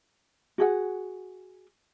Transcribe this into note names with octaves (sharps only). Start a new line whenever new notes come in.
F#4 G#4 F#5